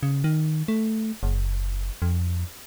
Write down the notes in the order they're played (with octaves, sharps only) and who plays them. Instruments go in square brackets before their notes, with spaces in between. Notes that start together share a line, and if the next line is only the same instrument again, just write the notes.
[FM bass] C#3
D#3
A3
F#1
F2